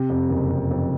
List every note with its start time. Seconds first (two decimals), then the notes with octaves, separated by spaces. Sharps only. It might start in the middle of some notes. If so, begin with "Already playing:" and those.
Already playing: C3
0.09 F2
0.29 F#1
0.50 C3
0.71 F2